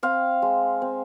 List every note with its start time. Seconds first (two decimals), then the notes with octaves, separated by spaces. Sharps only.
0.03 C4 F5
0.42 G#3
0.82 C4